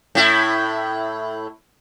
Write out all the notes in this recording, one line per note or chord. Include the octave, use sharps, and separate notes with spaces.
A2 E4